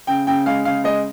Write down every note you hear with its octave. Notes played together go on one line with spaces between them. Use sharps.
C#3 G5
C#3 G5
G#3 F5
C#3 F5
G#3 D#5